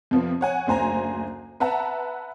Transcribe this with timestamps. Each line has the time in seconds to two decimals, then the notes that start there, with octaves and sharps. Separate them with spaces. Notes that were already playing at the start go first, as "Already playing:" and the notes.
0.11 F2 C3 F3 B3
0.41 C#5 F#5 G#5
0.67 F#1 D2 C5 G#5 A#5
1.60 B4 E5 F#5 A5 A#5